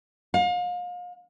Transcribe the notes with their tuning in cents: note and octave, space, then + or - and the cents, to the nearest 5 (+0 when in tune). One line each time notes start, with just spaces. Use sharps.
F5 +35